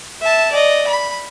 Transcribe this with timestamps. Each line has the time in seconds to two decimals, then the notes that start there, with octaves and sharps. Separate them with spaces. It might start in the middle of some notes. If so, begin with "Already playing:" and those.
0.21 E5 A5
0.51 D5 D#5
0.87 B5